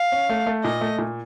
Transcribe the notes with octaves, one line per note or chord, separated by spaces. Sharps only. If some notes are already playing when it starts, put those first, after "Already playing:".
Already playing: F5
C#4
A3
A3
A#2 D#5
A3
A#2